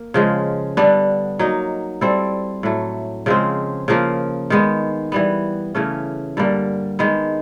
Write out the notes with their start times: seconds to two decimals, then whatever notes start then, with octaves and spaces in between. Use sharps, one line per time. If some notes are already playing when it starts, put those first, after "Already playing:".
Already playing: A#3
0.14 C#3 F3 G#3
0.77 D3 G3 B3 D4
1.39 F#3 A#3 D#4
2.01 G3 C4 E4 A4
2.63 A2 F#3 A3
3.26 C#3 F3 G#3 C4
3.88 C#3 F3 A#3
4.50 D#3 G#3 B3
5.12 E3 G3 B3
5.75 C#3 E3 A3 C#4
6.37 G2 D3 G3 A#3
6.99 D#3 G#3 B3